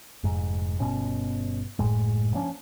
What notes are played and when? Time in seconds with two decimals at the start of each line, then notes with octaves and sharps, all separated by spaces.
0.24 F1 G#2
0.80 G1 B2 C#4
1.79 F#1 C#2 A2 G#3
2.34 F3 A#3 C#4 D4